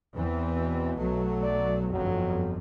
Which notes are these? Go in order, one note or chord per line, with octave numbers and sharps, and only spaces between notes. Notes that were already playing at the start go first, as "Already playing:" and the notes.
E2 E3 C4
B2
B1 F#3 A3
D5
G1 F2 F#3